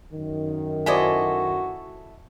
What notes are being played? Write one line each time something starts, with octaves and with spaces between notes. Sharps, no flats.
F#2 D#3
E4 F#4 A4 C5 D5 D#5 G#5